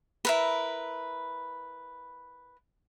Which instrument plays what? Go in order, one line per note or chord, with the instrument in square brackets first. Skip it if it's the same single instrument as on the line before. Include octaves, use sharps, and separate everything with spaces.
[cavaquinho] E4 A#4 B4